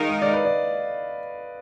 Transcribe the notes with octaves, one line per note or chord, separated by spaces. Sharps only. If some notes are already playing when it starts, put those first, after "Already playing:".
Already playing: D#3 G#3 D#4 A#4 F5
D#5
D5
B4
D5